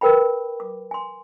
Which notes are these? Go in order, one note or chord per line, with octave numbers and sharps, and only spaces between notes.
A#4 B4 G5 B5
D6
G#5 C6